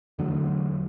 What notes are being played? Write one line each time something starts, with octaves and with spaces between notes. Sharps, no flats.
E2 D3 F#3 A3